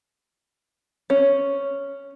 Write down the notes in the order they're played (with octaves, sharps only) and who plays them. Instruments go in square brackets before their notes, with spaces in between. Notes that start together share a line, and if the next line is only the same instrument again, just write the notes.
[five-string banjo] C#4